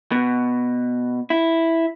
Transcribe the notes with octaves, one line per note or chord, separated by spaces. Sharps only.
B2
E4